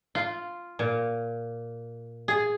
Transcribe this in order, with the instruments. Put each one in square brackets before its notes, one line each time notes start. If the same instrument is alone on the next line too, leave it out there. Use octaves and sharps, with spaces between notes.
[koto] F4
A#2
G#4